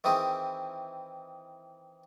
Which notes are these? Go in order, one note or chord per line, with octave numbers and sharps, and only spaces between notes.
D#3 E3 C4 E4 G#4